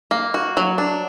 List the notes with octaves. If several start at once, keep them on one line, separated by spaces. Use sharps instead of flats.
A#3
F#4
F#3
D4